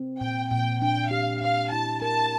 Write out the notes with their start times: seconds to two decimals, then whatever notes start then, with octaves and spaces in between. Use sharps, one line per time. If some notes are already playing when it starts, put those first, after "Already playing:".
Already playing: C4
0.20 A#2 G5
0.51 A#2 G5
0.81 D4 G5
1.11 G4 F5
1.41 A#2 F5
1.72 E4 A5
2.02 A#4 A5